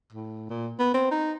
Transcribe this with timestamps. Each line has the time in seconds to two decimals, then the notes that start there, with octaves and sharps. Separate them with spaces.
0.12 A2
0.50 A#2
0.79 B3
0.94 C4
1.11 D#4